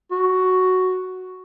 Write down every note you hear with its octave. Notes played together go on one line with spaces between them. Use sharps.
F#4